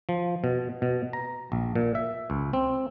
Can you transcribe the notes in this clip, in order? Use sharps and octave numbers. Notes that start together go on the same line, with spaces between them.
F3
B2
B2
A#5
A#1
A#2
E5
C#2
C4